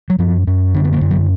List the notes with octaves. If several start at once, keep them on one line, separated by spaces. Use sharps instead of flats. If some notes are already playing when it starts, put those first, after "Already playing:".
F#3
F#2 F3
F#2
D3 D4
B3
A#3
F#2
F#3